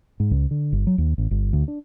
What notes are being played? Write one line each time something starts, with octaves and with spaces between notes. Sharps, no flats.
G#2
C#2
D3
G1
F#3
D#2
A1
G1
D2
D4